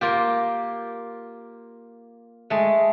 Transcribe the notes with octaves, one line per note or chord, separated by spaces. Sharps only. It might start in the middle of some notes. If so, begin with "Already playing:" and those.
A#3 F4 G4
G#3 A3